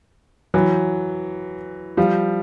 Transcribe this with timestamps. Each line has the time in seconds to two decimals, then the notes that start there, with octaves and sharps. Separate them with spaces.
0.54 E3 F#3
1.97 F3 G3